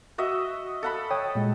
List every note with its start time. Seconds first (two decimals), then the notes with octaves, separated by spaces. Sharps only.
0.18 F#4 D#5 E5
0.83 A4 F#5 B5
1.11 C#5 G5 D#6
1.35 A#2 G#3